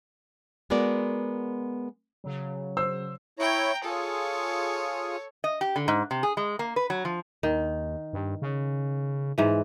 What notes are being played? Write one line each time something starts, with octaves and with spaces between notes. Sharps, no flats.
G#3 B3 F#4 A#4 D5
C#3 F#3
C5 E6
E4 C#5 G5 A#5
F4 G#4 A4 C#5
D#5
G4
D3
G#2
C3
G#4
G#3
A#3
B4
F#3
F3
D#2 D#3
G2
C#3
G#2 E3